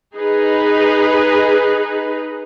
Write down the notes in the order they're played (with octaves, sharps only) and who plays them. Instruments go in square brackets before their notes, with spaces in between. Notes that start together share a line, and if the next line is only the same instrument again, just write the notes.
[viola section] D#4 G#4 B4